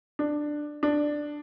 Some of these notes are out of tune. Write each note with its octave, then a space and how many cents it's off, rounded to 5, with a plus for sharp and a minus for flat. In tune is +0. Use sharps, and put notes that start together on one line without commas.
D4 +10
D4 +5